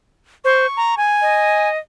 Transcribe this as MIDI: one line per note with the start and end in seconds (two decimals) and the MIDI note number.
0.45 0.67 72
0.45 0.95 85
0.77 0.95 82
0.97 1.69 80
1.22 1.79 75